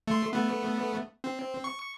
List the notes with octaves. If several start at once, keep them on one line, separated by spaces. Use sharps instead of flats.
A3 C6
A3 B3
C4
C#6